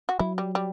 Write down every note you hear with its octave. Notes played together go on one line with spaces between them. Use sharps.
F#4
F#3 E4
G3
G3